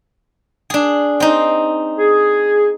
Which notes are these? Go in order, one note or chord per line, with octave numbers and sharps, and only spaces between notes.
D4 G#4
C4 D#4
G#4